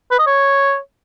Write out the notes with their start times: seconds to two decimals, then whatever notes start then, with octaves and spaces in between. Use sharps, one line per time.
0.11 B4
0.19 D#5
0.27 C#5